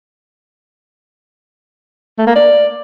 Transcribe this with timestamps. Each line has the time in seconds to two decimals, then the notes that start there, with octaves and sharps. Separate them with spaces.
2.18 A3
2.27 A#3
2.36 D5